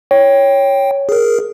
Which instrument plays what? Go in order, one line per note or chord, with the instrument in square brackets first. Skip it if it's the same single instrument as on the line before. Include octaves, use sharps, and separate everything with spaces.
[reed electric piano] C#5 [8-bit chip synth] G5
[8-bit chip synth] G#4 A#4